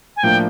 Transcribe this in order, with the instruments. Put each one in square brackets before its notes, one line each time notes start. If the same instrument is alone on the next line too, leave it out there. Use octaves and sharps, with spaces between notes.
[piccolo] G#5
[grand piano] A2 F3 A#3 D4 [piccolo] G5